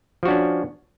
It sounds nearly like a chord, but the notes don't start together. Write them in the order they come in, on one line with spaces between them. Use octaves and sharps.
F3 F#4 D4 C#4